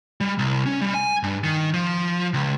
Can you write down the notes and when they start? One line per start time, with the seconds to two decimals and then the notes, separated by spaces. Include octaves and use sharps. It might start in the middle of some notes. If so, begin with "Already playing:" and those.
0.21 G3
0.39 C2
0.66 C#4
0.82 G3
0.94 G#5
1.23 G2
1.44 D#3
1.74 F3
2.34 C#2